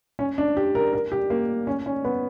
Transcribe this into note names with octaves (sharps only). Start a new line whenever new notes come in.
C#4
D4
G4
A#4
A#4
G4
A#3
C#4
C#4
B3